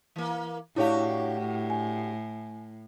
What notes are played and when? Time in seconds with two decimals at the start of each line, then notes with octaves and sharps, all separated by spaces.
0.16 E3 A#3
0.76 A2 D4 E4 F#4 G4 C#5 F5
1.70 G#5